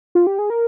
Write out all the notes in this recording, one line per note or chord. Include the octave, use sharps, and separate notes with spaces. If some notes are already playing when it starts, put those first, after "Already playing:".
F4
G4
G#4
A#4